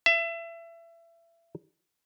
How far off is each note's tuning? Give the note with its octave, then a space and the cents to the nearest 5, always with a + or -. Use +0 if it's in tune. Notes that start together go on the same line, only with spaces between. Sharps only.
E5 +30